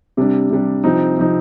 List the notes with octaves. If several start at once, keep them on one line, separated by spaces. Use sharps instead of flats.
C3 G3 D4
C3 G3 D4
C3 F3 C4 D#4
C3 F3 C4 D#4